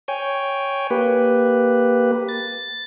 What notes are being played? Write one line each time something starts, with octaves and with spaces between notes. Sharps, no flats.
C#5 G5 G#5
A#3 G4 B4
A6